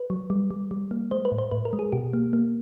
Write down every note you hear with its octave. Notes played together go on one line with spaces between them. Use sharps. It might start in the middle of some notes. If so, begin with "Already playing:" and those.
Already playing: B4
F#3
G3
G3
G3
A#3
G#3 C5
B4
A2
C5
A2 B4
A#4
G#3
G#4
B2 G4
A#3
A#3